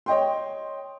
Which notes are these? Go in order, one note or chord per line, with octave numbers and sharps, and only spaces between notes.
C#5 D#5 G5 C6